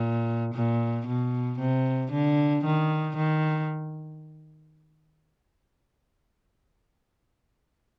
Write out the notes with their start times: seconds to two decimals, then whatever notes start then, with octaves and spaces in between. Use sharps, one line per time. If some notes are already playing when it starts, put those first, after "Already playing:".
Already playing: A#2
0.54 A#2
1.07 B2
1.59 C3
2.12 D3
2.65 D#3
3.16 D#3